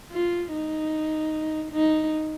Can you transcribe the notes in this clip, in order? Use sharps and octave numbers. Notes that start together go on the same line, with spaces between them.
F4
D#4
D#4